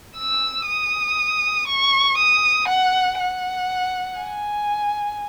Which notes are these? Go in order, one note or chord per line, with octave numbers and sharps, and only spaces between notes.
E6
D#6
C#6
D#6
F#5
F#5
G#5